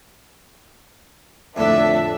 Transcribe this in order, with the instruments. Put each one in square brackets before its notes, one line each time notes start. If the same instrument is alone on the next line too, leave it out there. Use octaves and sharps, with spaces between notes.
[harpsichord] F2 A2 D3 [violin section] D4 E5